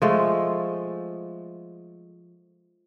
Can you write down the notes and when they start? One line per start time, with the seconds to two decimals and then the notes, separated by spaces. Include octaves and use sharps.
0.02 F3 G#3 A3